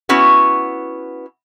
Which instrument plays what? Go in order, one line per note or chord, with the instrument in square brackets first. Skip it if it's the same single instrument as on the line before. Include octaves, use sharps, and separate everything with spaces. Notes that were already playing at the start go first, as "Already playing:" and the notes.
[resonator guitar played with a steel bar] B3 C#4 E4 F#4